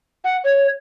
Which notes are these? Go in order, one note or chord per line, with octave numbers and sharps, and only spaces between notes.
F#5
C#5